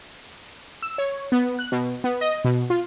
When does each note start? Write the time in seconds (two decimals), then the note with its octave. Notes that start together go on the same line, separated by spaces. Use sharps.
0.82 E6
0.98 C#5
1.32 B3
1.59 F#6
1.72 B2
2.04 B3
2.21 D#5
2.45 B2
2.70 F4